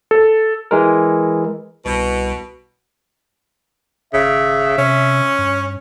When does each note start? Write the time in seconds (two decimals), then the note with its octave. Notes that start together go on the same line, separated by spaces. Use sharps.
0.11 A4
0.71 E3 G#3 A#4
1.85 C2 B2
4.14 G#1 C#3 E5
4.78 C3 C#4
5.38 G2